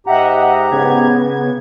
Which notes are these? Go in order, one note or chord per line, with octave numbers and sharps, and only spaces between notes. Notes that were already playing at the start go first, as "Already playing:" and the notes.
G#2 G4 D#5 E5 F#5 A#5
C#3 B3 G#6